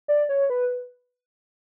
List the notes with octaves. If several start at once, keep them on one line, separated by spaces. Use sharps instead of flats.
D5
C#5
B4